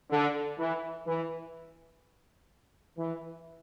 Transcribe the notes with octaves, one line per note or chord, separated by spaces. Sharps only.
D3
E3
E3
E3